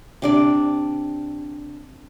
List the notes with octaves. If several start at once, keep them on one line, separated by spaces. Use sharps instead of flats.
C3 D4 D5